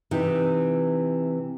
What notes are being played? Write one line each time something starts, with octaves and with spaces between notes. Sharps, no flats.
C3 E3 D#4